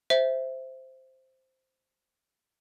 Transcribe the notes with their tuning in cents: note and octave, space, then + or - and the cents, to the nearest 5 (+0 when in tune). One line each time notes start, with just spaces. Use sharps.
C5 +0 E5 +0